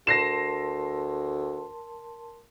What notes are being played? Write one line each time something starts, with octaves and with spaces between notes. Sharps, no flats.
D2 A#4 A5 C6 A#6 C7 E7